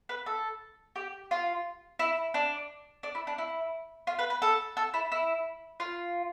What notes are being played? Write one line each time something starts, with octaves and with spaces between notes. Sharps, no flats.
B4
A4
G4
F4
E4
D4
D4
E4
D4
E4
F4
B4
B4
A4
A4
E4
E4
F4